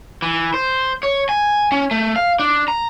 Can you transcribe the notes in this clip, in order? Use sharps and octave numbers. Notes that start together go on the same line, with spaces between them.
E3
C5
C#5
G#5
C#4
A3
F5
D4
A#5